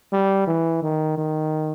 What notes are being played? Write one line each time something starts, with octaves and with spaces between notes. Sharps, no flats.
G3
E3
D#3
D#3